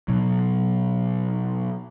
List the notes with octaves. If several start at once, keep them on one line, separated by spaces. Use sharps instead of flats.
B2 F#3